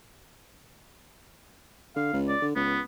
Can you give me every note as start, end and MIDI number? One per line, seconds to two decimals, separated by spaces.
1.96 2.13 50
1.96 2.18 77
2.13 2.35 37
2.28 2.45 74
2.42 2.53 50
2.56 2.79 37
2.56 2.80 59